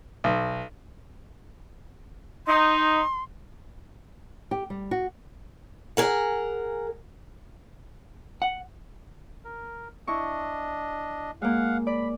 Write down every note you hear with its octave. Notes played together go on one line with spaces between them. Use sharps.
B1
D#4 C6
G4
G3
F#4
G#4 A#4 F#5
F#5
A#4
D4 E4 D#5 C#6
G#3 A#3 F5 F#5
D5 B5